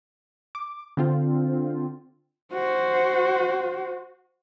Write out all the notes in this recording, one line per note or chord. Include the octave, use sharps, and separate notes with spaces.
D6
D3 C4 F4
F#4 C5